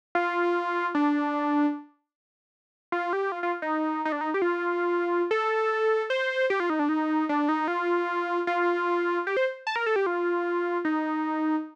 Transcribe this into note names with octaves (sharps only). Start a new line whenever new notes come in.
F4
D4
F4
G4
F4
F4
D#4
D#4
D4
D#4
G4
F4
A4
C5
G4
F4
D#4
D4
D#4
D4
D#4
F4
F4
G4
C5
A5
A#4
A4
G4
F4
D#4